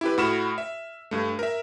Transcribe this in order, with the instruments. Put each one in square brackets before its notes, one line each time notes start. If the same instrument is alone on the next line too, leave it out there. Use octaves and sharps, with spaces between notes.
[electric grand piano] E4 G4 B4
A2 F#4 B5 F6 E7
E5
G2 A3
A#4 E5